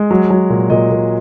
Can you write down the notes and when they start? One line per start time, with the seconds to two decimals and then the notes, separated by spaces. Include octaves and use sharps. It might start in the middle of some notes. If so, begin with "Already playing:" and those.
Already playing: G#3
0.11 F#3
0.30 F#3
0.50 A#2
0.70 A#2 D#5
0.90 A#2